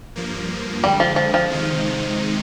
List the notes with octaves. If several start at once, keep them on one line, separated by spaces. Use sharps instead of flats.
G2 F3 A#3
F2 D3 G3 G#3
F3
F3
F3
C3 D#3 G#3 D#4